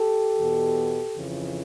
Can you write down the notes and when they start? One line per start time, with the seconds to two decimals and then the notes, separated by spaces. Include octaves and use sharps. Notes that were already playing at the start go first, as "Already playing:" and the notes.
Already playing: G4 A4
0.36 E2 B2
1.15 F2 C#3 E3